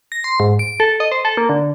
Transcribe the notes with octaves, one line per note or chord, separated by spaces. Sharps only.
A#6
C6
G#2
D7
A4
D#5
C5
A4
A#3
D3